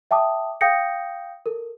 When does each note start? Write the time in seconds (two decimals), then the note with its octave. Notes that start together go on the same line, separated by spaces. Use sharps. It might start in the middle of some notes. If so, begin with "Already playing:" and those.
0.11 E5 G5 A5 D6 D#6
0.61 F5 G5 D#6 G6 A#6 C#7
1.46 A4 A#4